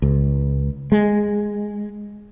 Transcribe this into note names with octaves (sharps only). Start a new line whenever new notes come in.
C#2
G#3